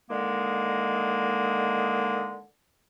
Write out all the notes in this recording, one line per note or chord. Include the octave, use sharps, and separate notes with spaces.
D3 D#3 G#3 A#3